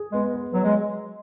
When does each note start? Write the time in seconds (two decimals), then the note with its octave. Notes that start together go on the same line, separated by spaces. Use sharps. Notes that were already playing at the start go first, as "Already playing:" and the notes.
Already playing: G#4
0.13 G#3 B3
0.33 B4
0.53 F#3 B3
0.64 G#3